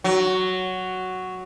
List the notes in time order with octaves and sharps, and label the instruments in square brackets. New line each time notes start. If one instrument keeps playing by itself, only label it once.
[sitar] F#3